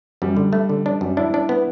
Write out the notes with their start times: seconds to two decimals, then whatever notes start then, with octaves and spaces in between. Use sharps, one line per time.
0.22 F#2 G3
0.37 D3
0.53 A3
0.69 D3
0.86 D4
1.01 F#2
1.17 D4 E4
1.34 D4
1.49 B3